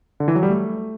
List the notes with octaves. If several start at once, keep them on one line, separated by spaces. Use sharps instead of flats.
D3
E3
F#3
G3
A3